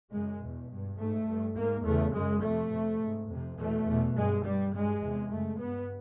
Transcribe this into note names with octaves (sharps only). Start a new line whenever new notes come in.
F#2 C#3 G#3
E2 B2
G2
G#2 A3
G2
G#2 A#3
E2 C#3 A3
F#2 C#3 G#3
F2 C3 A3
F2 C3
G#2
F2 C3
E2 B2 A3
E2 B2
G2 G#3
G2 G3
G2 G#3
E2 C3
F#2 C#3 A3
G2 B3